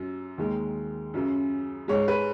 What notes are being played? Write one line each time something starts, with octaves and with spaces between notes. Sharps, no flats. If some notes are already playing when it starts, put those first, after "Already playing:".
Already playing: F#2 F#3
D#2 D#3 G#3
F#2 C#3 F#3
G#2 G#3 C#5
B4